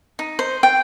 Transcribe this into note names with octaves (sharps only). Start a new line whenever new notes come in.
D#4
C5
G5